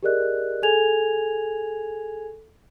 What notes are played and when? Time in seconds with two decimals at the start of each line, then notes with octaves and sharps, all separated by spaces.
0.03 G4 G#4 A#4 D5 D#5 F#6
0.62 G#4 A4 G#5 G#6 F7